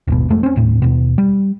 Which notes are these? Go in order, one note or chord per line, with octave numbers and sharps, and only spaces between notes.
D#1 G#1 B2
F2 G#3 A3
C4 C#4
D#1 A2
D#2 B2
G3